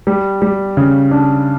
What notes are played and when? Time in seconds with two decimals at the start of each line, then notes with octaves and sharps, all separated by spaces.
0.07 G3
0.42 G3
0.77 C#3
1.11 D4